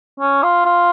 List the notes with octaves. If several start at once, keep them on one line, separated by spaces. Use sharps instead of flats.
C#4
F4
F4